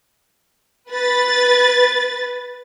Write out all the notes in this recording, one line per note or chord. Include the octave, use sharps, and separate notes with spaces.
B4 A6